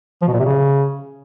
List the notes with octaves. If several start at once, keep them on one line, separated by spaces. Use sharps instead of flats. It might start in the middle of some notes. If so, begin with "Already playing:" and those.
F3
B2
A#2
C3
C#3